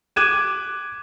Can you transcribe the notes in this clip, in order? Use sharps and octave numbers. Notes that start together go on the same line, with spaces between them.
D6 F#6 G#6 D#7 E7